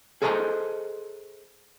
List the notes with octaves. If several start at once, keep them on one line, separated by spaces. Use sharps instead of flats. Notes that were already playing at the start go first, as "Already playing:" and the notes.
G#4 A4 C5 D#5 G5 A#5